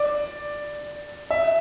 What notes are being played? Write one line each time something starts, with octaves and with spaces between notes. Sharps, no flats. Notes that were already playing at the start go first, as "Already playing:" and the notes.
Already playing: D5
E5